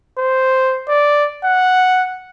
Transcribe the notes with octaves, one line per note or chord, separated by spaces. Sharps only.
C5
D5
F#5